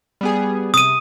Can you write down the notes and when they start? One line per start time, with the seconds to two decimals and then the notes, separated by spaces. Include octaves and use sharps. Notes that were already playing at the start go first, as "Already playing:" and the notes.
0.21 G3 B3 G#4
0.74 C3 D#6 D#7